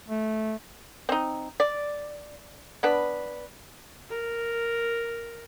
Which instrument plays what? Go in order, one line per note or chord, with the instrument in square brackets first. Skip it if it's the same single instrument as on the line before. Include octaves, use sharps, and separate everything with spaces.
[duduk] A3
[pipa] C4 D#4
D5
B3 D4 B4
[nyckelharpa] A#4